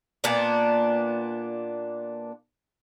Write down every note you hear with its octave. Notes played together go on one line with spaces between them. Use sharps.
A#2 A#3 B3 D4